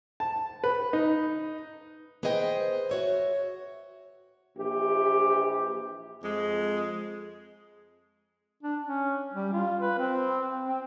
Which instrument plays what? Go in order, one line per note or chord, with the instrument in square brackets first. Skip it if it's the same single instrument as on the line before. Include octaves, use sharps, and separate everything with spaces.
[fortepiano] A5
B4
D#4
[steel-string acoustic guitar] B3 G#4 C5 D#5 F5 G5
F#4 C#5 E5
[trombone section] A#1 E3 G4
[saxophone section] F2 G#3
[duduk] D4
C#4
G3
F4
B4
C4
C4